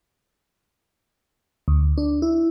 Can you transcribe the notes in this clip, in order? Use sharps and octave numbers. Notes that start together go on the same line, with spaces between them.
D2
D4
E4